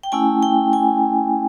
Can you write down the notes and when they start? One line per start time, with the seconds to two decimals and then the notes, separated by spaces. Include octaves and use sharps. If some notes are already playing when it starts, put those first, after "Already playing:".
0.03 G5
0.12 A3 C#4 E4 G#5
0.43 G5
0.73 G#5